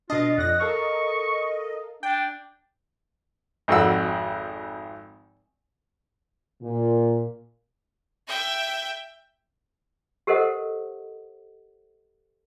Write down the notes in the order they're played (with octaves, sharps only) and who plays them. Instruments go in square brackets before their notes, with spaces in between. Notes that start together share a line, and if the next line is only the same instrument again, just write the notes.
[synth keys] B2 D4 [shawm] F4 [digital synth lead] D#5
[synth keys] F2 D5 A#6 [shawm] F#5
[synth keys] A4 A#4 F5 [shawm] C#6
[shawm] D4 [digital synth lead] G5
[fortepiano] G#1 F2 F#4 F#5 E6
[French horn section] A#2
[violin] E5 G5
[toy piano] G4 A4 A#4 C5 D#5 F#5